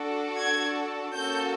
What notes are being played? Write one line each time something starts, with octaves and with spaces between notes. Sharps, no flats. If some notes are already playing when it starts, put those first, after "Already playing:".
Already playing: D4 F#4 A4
G#6
A#3 C#4 F#4 A4 G6